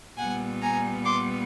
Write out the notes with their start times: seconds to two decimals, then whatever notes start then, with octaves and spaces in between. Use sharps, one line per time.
0.18 A#2 G3 B3 F#5 G#5
0.61 G#5 A#5
1.05 C6 D6